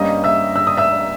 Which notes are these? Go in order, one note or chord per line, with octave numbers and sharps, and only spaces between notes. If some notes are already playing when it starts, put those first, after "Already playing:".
Already playing: G2 G3 A#3 C#4 D#5 D#6
E5 E6
E6
D#6
E5 E6